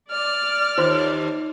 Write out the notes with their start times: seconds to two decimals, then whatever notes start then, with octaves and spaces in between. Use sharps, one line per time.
0.11 D5 F6
0.78 D#2 F4 C5 C6